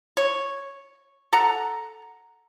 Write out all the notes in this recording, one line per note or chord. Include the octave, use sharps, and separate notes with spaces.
C#5
A4 F#5 A#5